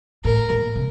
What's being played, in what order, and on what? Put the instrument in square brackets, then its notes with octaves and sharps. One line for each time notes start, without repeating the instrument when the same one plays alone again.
[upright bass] A2 [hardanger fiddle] A#4
[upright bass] A#2
C3